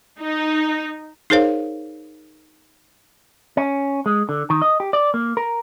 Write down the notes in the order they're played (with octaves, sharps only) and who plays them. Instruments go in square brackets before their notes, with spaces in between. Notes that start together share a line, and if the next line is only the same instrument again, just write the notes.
[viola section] D#4
[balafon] D#4 G#4 A#4 C5 C#5 F5
[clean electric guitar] C#4
G#3
D3
D#3
D#5
G4
D5
A#3
A#4